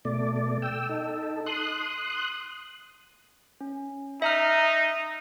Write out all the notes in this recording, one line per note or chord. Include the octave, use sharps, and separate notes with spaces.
B2 A3 D5
G5 E6
D#4 A4
C6 D#6 F#6
C#4
D#4 E5 A#5 F6